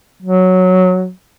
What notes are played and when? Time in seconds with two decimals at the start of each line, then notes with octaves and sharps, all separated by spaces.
0.22 F#3